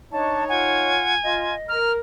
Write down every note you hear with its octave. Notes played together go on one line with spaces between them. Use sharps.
D4 D#4 C#5 D#5 A5
F4 F#5 G#5
F4 D#5
A#4 F6